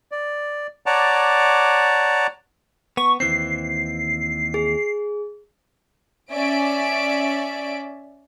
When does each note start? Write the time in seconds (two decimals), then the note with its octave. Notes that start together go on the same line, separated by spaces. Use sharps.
0.12 D5
0.86 C#5 D5 F#5 A5 A#5 D6
2.97 B3 C#6
3.20 D#2 E3 C4 C7
4.54 G#4
6.33 C#4 D5 E5 D7